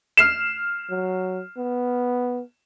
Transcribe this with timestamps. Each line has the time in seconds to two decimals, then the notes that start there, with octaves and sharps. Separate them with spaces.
0.17 F6 C7 E7
0.90 F#3
1.57 B3